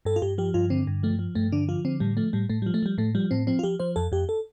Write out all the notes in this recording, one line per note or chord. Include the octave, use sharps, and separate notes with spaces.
G2 A4
F4
G2 G4
F3 G4
G2 F4
D3 C4
G2
F3 A3
F3
G2 A3
D3 D4
F3 F4
D3 C4
A2 G3
F3 A3
A2 G3
A2 A3
G3
F3
A3
F3 G3
A2 A3
F3 G3
A2 C4
F3 C4
F4
F3 G4
F3 C5
F2 A4
F2 G4
A4